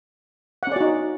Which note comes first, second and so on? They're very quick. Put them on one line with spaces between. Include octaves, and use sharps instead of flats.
F#5 C#4 D5 F#4 D#4